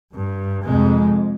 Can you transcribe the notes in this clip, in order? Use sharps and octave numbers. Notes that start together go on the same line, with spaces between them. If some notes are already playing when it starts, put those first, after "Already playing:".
G2
F2 C3 G#3